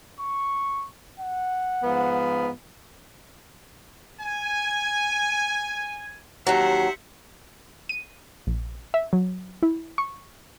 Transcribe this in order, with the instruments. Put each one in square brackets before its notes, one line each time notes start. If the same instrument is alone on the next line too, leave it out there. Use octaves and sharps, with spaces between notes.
[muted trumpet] C#6
F#5
[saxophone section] G#2 F3 B3
[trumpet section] G#5
[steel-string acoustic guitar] D#2 F#3 [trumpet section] C5 E5 F#5
[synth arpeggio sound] D#7
A#1
E5
F#3
E4
C#6